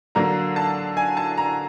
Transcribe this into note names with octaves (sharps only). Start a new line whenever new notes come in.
D3 F#3 A#3 A#5
A5
G#5
A5
A#5